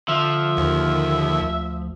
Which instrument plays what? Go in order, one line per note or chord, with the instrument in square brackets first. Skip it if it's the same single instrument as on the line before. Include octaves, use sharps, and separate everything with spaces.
[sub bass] D3 [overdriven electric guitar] F3 [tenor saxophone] E5
[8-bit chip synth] D#2
[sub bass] D2